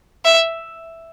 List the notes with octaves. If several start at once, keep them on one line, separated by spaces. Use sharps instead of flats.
E5